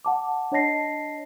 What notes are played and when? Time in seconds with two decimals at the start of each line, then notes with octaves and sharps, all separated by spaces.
0.05 F#5 A5 D6
0.52 D4 C#5 D#5 A5 A#6 C7